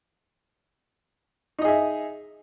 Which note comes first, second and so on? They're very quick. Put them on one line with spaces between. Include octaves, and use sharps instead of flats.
D#4 D#5 G#4 E5